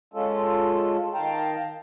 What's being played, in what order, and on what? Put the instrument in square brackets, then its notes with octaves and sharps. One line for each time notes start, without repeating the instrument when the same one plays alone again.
[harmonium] G#3 C#4 F4 A4
D#3 F5 G5 A5 A#5